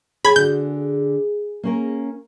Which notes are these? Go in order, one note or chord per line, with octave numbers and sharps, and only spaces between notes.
G#4 C#5 G#5 B5 G#6
D3 F#4 G6
A#3 C#4 A#4